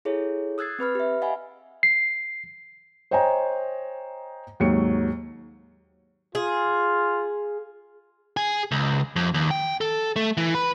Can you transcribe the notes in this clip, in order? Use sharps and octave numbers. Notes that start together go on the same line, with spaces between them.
E4 G#4 A4 C#5
D#6 E6 F#6 G#6 A6 C7
C4 B4 B5 F6
G4 E5
D#5 F5 F#5 G#5 B5
C7
C5 C#5 D#5 G5 G#5 A#5
D#2 G#2 F#3 C#7
F4 G#4
G#4
C#2
F2
D#2
G5
A4
A3
E3
B4